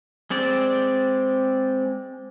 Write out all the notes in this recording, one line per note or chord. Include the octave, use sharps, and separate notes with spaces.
G#3 C4 D5